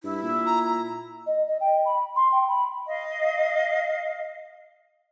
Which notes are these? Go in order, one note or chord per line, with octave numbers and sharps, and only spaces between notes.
G2 E4
A#2
A#5
A#5
D#5
D#5
G5
B5
C6
G5
B5
D#5 F5